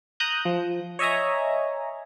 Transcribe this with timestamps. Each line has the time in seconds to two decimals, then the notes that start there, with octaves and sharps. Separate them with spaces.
0.20 A#5 D#6 F#6 G6
0.45 F3
0.99 C#5 D#5 E5 G#5 A#5